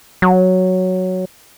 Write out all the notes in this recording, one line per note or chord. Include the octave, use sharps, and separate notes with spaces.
F#3